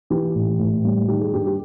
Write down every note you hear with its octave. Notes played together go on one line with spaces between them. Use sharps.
E3 G4
A2
A2
G3
D#3 G4
G#4
G2 G4
G4